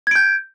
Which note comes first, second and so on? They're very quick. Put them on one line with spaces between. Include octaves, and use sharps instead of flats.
G#6 D7 G6